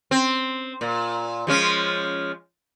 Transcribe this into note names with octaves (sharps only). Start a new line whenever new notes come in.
C4
A#2
F3 G#3 C#4